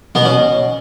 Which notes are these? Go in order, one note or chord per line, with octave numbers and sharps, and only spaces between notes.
B2 B3
C#4